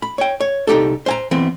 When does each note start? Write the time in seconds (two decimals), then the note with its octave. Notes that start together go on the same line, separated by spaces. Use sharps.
0.02 B5
0.18 C#5 G5
0.41 C#5
0.67 C2 D#4 G4 A4
1.06 C5 G#5 A#5
1.31 E3 B3 C4